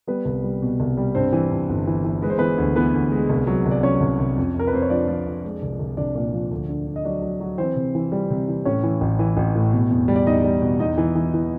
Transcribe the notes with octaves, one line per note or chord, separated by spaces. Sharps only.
G3 B3 B4
C2
G3
B2
C2
G3
G2 C4 C5
E3
G2
G1
E3
E3
G#3 B4
C5
E3 B3 B4
D2
E3 B3 B4
D2
G#3
C2
F#3
C2
D5
F#3 C#4 C#5
C2
C2
F2
F2 A#4
B4
F2 C5
C#5
F3 D4 D5
F3
F2
G#3
C2
C2
C2 D4 D5
A#2
F3
D2
D3
D3
D#5
F#3 D4 D5
F#3
F#3
E3 C4 C5
C3
E3
G3
C3
E3
A2 C#4 C#5
E3
A1
E3
A1
A2
B2
E2
G3
D5
E2 D#4 D#5
G3
B2
E2 D#4 D#5
E3
E3
E3